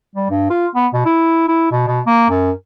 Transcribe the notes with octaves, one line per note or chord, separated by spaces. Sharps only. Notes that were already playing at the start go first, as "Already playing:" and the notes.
G3
G2
F4
B3
B2
E4
E4
B2
B2
A#3
F#2